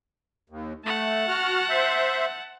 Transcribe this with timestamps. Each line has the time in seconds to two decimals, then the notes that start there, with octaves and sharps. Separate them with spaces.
0.50 D#2
0.85 A3 F#5 A5
1.29 F#4 F6
1.69 C5 E5